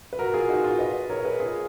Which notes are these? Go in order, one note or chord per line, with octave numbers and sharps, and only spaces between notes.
B4
F#4 A#4
F4 G#4
D#4 F#4
F4
B4 D#5
A#4 C#5
G#4 B4
F4 G#4